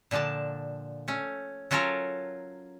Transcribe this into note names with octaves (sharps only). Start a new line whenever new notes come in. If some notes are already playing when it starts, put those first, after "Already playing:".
A#2 D3 F3 D4 A5
A3 C#4
F#3 C#4 F4 A4 A#4 C#5